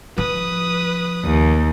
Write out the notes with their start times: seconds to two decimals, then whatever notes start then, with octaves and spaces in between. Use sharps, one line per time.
0.18 F3 B4 D#6
1.25 D#2